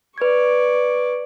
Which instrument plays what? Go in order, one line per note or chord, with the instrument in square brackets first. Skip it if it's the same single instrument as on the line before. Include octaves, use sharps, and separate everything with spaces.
[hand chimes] B4 G#6 [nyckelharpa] D5 C#6